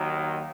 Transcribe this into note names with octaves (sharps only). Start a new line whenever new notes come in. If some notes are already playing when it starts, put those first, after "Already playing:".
Already playing: D#2 D#3 F#3